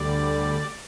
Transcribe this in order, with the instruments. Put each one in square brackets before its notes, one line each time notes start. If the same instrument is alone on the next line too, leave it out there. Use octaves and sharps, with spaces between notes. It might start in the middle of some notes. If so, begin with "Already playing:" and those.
Already playing: [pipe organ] D2 D3 G3 D5